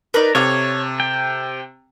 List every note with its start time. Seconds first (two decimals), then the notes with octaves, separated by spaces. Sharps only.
0.14 D#4 A#4 B4 D5
0.35 C3 A4 C#5 F5 D6
1.00 G5